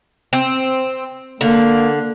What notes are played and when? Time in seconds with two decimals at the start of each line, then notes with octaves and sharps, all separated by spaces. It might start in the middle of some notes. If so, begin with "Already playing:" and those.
0.33 C4
1.41 D3 A#3